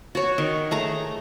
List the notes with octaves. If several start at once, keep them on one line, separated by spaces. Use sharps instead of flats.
F#4 C#5
D#3
A3 G#4 A#5